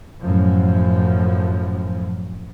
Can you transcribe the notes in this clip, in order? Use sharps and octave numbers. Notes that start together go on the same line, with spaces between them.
F#2 A2 F3